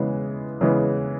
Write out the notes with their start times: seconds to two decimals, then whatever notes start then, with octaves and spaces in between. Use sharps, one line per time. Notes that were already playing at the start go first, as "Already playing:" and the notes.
Already playing: C#3 E3 G#3 B3
0.61 C#3 E3 G#3 B3